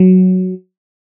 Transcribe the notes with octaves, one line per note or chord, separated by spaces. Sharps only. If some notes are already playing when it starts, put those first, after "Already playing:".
Already playing: F#3